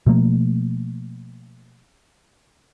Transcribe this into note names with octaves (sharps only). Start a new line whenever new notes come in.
B2 F3 A3 A#3